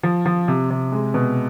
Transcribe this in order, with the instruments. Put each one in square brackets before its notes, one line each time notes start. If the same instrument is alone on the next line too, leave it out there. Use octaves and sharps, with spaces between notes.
[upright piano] F3
F3
C3
C3
G#3
B2